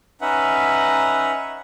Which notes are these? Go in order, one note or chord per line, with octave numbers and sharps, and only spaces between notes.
C#4 D#4 B4 E5 F#5